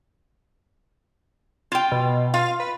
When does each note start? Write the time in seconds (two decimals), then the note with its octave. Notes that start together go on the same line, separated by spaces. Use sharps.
1.72 F4 G5
1.92 B2
2.34 F4 F5
2.60 B4